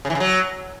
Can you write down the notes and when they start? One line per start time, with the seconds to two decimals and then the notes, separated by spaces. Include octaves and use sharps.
0.05 C#3
0.10 E3
0.15 C#3
0.20 F#3